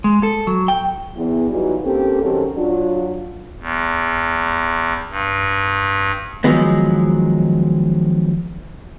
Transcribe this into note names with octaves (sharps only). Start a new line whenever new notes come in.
G#3
A4
F#3
G5
E2
E3 F#3 G3 D#4 F4 F#4
A#3 C4 C#4 G4 A4
D#3 F#3 C4 C#4 G4 A4
F#3 D4 F4
E2
G2
D#3 F3 F#3 G#3 B3